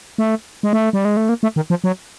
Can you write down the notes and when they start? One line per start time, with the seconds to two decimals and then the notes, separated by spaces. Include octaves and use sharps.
0.18 A3
0.63 G#3
0.73 A3
0.93 G3
1.05 G#3
1.17 A3
1.29 A#3
1.43 A3
1.56 D#3
1.70 F3
1.84 F#3